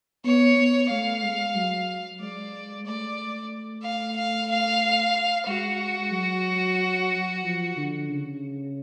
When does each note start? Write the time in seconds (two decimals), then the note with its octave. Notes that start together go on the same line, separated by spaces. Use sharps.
0.24 B3 C#5
0.56 B3
0.89 A3 F5
1.23 G#3
1.55 F#3
2.20 G#3 D5
2.86 A3 D5
3.83 F5
4.17 F5
4.49 F5
5.47 G#3 F#4
6.12 F#3
7.43 F3
7.76 D3
8.09 C#3